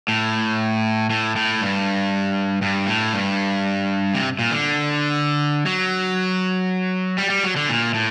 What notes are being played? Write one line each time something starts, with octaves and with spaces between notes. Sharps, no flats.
A2
A2
A2
G2
G2
A2
G2
C3
A#2
D3
F#3
G3
G3
F#3
D3
A#2
A2